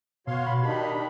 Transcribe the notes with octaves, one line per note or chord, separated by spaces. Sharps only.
B2 F#4 C#5 F5 C6
B5
D#3 D4 D#4 G4 B5